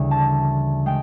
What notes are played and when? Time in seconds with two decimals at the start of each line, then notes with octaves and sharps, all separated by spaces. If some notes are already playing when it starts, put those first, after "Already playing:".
Already playing: D2 C#3 E3 G3
0.11 A5
0.86 G#3 G5